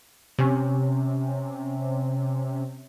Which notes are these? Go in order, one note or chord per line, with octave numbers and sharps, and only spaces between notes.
C3 C#4